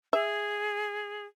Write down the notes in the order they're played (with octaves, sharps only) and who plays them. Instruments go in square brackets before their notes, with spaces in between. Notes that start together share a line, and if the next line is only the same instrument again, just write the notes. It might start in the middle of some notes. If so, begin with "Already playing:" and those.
[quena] G#4 [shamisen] E5